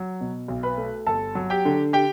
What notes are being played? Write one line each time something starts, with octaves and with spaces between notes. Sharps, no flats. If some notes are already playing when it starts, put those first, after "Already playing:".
Already playing: F#3
B2
B1
B4 B5
A3
G1 A4 A5
F#3
G4 G5
D3
G4 G5